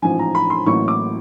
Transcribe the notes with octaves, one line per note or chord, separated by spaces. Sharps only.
A1 G#2 F3 G#5
A#5
B5
C6
A1 A2 F#3 A#3 C#6
D6